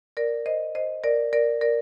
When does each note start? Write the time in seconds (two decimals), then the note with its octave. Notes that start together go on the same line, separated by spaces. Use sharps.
0.17 A#4 D5
0.46 C5 D#5
0.75 C5 D#5
1.04 A#4 D5
1.33 A#4 D5
1.61 A#4 D5